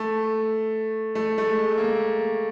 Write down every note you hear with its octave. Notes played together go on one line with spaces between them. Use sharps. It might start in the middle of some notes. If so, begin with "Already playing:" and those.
Already playing: A3
A3
A3
G#3
A#3